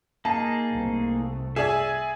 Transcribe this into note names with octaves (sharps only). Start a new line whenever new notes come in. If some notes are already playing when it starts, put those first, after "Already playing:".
A#3 D#4 G#4 A5
C2 A3
G#4 D5 E5 G#5